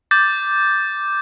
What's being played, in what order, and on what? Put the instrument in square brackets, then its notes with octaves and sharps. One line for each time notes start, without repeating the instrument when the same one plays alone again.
[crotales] D6 G6 A6